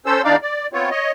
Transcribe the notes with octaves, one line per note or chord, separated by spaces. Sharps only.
C#4 A4 C5 E6
E2 D4 D#4 D5 F5
D5
B3 C4 F4 C#5
C#5 D#5